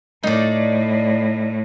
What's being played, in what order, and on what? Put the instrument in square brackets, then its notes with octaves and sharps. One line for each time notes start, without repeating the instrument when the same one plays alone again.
[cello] A2 [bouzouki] D#4 D5